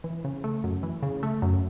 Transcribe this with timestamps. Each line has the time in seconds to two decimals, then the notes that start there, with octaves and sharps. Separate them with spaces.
0.04 E3
0.24 C#3
0.44 A3
0.64 F#2
0.83 E3
1.03 C#3
1.23 A3
1.42 F#2